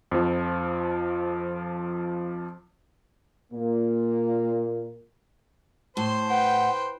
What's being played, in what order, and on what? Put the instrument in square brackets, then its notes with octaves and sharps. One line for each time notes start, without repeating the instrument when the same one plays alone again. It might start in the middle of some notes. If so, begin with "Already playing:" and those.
[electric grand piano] F2 F3
[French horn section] A#2 A#3
[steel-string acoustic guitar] A2 [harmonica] C5 [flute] A5 [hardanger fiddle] C6
[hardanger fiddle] B4 G5 [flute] F#5